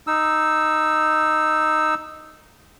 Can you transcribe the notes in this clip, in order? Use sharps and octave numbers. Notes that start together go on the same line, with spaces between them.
D#4 E6